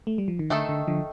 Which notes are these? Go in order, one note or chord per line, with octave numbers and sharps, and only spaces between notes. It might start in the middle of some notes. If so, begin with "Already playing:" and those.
A3
G3
F3
D#3
D3 D#3 A3 D#4 A4
D3
D3 F3